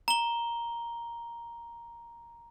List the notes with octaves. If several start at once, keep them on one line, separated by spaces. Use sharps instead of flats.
A#5 G7